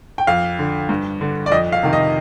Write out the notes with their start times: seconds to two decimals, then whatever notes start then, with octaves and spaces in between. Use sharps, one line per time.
0.18 G5
0.27 F2 F5
0.59 D3
0.89 G2
1.21 D3
1.46 D5
1.52 F2 D#5
1.72 F5
1.83 C3 D#3
1.93 D#5